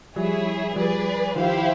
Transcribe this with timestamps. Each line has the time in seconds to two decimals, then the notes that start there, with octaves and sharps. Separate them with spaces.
0.16 F3 G3 E4 G#4 C#5
0.76 F3 G3 G#4 B4 D5
1.36 D#3 F3 E4 G4 C5 F5